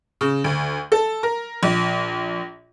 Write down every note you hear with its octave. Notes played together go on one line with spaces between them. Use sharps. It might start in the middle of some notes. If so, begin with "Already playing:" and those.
C#3
D2
A4
A#4
A#1